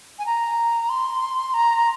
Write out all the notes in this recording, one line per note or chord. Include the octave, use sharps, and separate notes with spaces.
G#5
A#5
C6
A#5